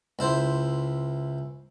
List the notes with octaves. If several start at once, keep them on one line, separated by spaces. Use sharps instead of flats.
C#2 E4 C5